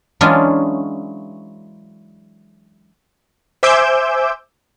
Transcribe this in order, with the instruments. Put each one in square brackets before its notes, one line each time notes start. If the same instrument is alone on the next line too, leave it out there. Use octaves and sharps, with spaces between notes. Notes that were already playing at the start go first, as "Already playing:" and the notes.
[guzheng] E3 F#3 G#3 C#4 D4 F4
[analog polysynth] C5 E5 G#5 D6 E6 G6